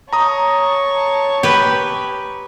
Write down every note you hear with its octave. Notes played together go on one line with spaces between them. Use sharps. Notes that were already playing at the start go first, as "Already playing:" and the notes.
C#5 A5 A#5 C#6 D#6
G4 B4